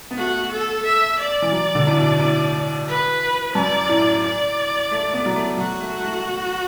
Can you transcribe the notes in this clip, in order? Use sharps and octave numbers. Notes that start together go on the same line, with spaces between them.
B3
A3 F#4
A4
E5
D5
E3
F#3
D3
A2
B2
A2
B4
F#2 D5
A2
D5
A3
B3
F#3
A3
F#3 F#4
A3
A3